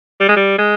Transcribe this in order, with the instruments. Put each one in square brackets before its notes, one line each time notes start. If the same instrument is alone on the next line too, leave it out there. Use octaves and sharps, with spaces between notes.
[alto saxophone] G3
G#3
G3
G#3